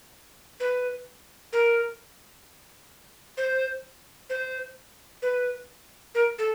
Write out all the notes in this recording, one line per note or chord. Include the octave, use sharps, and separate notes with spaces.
B4
A#4
C5
C5
B4
A#4
A4